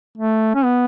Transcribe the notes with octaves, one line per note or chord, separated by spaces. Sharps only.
A3
C#4
B3